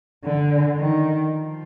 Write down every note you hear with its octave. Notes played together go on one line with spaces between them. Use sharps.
D3
D#3
F3